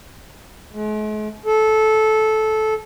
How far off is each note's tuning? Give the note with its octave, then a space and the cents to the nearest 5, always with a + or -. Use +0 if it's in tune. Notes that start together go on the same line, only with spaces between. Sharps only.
G#3 +45
A4 -15